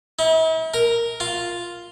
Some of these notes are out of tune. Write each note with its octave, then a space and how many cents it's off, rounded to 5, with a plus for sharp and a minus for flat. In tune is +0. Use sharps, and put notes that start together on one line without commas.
E4 -45
A#4 +0
F4 +0